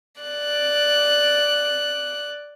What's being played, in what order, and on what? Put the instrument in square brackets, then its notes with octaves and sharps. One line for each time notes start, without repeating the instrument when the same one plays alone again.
[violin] D5 F#6